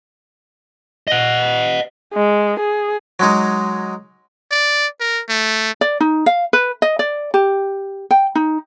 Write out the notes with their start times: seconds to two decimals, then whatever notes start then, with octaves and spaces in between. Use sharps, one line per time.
1.08 D#5 F#5
2.13 G#3
2.60 G#4
3.19 F#3 G#3 D#4
4.51 D5
5.00 A#4
5.29 A3
5.81 D5
6.00 D#4
6.26 F5
6.53 B4
6.82 D#5
6.99 D5
7.34 G4
8.11 G5
8.35 D#4